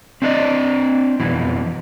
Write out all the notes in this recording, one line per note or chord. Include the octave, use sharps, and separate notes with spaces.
C4 D4 D#4 F4 D5 D#5
F2 B2 E3